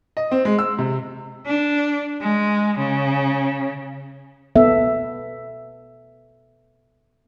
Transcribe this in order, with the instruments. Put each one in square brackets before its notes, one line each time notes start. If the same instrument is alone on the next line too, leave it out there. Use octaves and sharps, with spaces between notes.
[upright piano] D#5
C4
G#3
E6
C3
[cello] D4
G#3
C#3
[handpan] B3 A4 E5